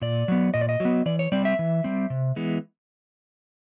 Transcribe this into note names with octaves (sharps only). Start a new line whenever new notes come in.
A#2 D5
F#3 B3
A#2 D#5
D5
D#5
F#3 B3
E3 D5
C#5
G3 C4 D5
E5
E3
G3 C4
C3
E3 G#3 B3